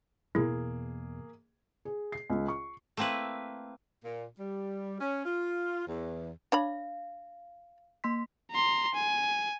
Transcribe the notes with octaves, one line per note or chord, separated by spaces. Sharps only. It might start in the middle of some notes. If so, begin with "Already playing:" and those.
E2 B2 A#3 E4 G#4
G#4
C7
C#2
C#6
A3 A#3 C4 E4 B4
A#2
G3
C#4
F4
E2
D4 C#5 F5 B5
A#3 C6 B6
A#5 C6
G#5